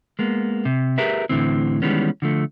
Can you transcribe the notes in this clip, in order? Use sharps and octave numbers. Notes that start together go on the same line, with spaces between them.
G#3 A#3 B3
C3
G4 G#4 A#4 B4 E5
D2 A2 D3 E3 C4
D#3 E3 G3 G#3 B3 C#4
D3 F3 A3